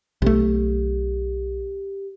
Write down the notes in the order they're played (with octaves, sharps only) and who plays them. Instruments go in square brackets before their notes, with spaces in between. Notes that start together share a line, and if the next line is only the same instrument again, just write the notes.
[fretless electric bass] B1 A3 [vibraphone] G4